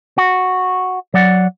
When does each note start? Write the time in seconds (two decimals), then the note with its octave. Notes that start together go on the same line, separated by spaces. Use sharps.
0.18 F#4
1.14 F#3 D5 F#5